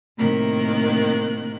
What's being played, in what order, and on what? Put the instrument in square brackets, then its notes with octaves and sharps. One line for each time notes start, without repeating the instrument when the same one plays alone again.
[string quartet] A2 C3 D#3 A#3 A#4 F#6